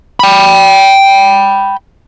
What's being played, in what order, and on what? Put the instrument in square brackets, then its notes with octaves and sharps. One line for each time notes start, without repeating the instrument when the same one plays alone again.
[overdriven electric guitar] G5 B5